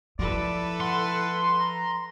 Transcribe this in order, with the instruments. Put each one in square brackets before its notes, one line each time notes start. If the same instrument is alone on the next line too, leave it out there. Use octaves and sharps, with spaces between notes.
[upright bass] F3 [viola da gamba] E4 A4 B4 [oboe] D5
[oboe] F#5 [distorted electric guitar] C6
[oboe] A#5